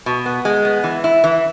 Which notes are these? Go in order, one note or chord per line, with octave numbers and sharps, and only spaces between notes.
B2
B3
G#3
B3
E3
E4
E3